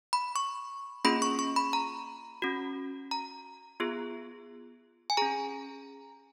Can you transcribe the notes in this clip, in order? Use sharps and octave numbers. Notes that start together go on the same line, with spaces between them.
B5
C#6
A#3 C#4 F4 G#4 B5
C#6
C#6
B5
A#5
C#4 F#4
A#5
B3 F4 G#4
G#5
C#4 G#4 A#5